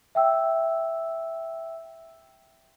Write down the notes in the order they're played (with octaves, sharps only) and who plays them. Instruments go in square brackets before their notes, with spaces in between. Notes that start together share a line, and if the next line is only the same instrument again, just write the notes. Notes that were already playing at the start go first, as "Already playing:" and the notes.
[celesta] E5 G5 E6